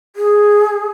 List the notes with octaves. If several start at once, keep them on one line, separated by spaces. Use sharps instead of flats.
G#4